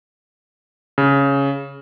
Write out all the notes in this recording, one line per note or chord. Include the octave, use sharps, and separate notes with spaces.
C#3